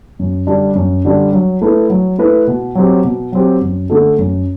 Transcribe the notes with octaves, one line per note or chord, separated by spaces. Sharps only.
F#2
D3 G3 D4
F#2
D3 G3 D4
F#3
A3 E4 B4
F#3
A3 E4 B4
B2
F#3 C4 G4
B2
F#3 C4 G4
F#2
D3 A3 D4 A4
F#2